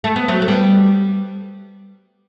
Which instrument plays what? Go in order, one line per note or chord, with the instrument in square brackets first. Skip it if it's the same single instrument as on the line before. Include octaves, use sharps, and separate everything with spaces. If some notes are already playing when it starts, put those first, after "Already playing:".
[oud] A3
B3
F#3 A3
A3
G3 B3